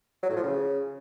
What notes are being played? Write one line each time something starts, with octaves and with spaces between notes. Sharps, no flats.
F#3
A2
F3
C#3